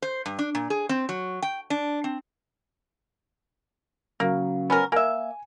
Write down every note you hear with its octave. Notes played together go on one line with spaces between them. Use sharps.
C5
G2
D4
A#2
G#4
C4
F#3
G5
D4
C4
C#3 F#3 A#3
B3 C#4 A#4
A#3 E5 G#5